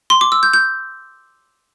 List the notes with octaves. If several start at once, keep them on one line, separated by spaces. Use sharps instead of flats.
C6
D6
E6
G6
G6